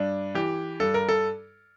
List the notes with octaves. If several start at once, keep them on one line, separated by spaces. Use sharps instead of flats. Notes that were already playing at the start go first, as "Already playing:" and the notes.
Already playing: G2 D4
E3 G4
G2 A4
A#4
A4